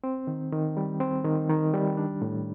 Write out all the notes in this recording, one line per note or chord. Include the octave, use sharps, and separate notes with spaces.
C4
D#3
D#3
G3
C4
D#3
D#3
G3
D4
A2